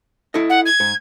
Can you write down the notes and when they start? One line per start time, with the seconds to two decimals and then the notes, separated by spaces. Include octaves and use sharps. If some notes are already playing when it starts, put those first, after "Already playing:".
0.34 E4 A4 D#5
0.49 F#5
0.65 G#6
0.80 G#2